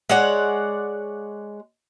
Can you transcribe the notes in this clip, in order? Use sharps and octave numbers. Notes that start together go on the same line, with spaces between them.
G#3 C#5 D5 F#5